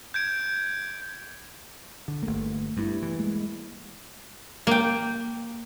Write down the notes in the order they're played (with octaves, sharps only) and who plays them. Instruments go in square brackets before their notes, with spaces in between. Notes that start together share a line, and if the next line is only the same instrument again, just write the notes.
[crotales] G6 G#6 D7
[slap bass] D3
[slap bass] G1 A#3 [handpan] A3
[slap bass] G2 [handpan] G3 B3 E4
[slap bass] E3
[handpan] G#3 A#3
[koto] A#3 G5